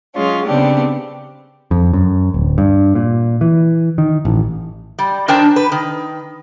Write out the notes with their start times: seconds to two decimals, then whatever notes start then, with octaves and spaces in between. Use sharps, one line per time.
0.15 F#3 G#3 C#4 F4
0.45 C#3 B3 C4 D4 G4
1.71 F2
1.93 F#2
2.34 D1
2.58 G2
2.95 A#2
3.41 E3
3.98 D#3
4.25 A1
4.99 G3
5.28 D#3 D4 A#4 C5 G5 A5
5.56 B4
5.72 D#3